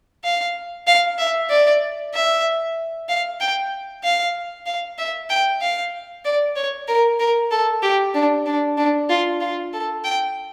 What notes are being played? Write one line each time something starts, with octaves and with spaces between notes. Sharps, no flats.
F5
F5
E5
D5
E5
F5
G5
F5
F5
E5
G5
F5
D5
C#5
A#4
A#4
A4
G4
D4
D4
D4
F4
F4
A4
G5